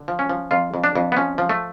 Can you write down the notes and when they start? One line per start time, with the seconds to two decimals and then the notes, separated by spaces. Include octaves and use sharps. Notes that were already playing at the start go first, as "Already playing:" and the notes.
Already playing: D3
0.08 F3
0.19 C#4
0.29 F3
0.51 F2 F4
0.74 F2
0.84 D4
0.96 F2
1.12 B3
1.17 F3 C#4
1.38 F3
1.49 A3